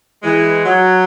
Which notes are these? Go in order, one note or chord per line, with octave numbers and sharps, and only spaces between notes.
E3 G#3
F#3